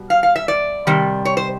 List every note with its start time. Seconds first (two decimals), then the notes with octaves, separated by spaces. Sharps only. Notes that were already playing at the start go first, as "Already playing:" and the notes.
Already playing: B2 G3
0.10 F5
0.23 F5
0.36 E5
0.48 D5
0.87 C3 D#3 G3
1.25 C#5
1.37 C5